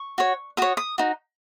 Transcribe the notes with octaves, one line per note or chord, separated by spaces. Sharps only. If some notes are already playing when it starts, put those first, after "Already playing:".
Already playing: C#6
F#4 C#5
F#4 C#5 D#6
D#6
D#4 F#4